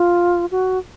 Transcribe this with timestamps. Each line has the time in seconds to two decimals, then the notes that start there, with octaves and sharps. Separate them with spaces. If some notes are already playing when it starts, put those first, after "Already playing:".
Already playing: F4
0.51 F#4